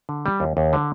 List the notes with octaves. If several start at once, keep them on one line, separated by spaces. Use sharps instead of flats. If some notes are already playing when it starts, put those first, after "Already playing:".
D3
G3
D#2
D#2
D3